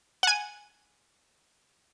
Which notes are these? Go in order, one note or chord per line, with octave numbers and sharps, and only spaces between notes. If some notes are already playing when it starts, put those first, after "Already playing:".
F#5 G#5